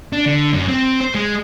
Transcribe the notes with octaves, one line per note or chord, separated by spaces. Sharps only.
D4
D3
F#2
C4
C5
G#3